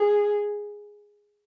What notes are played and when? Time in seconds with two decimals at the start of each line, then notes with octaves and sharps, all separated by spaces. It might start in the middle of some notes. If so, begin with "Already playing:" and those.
Already playing: G#4